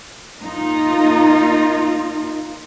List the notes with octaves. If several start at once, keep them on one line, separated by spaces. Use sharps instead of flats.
A#3 D#4 F4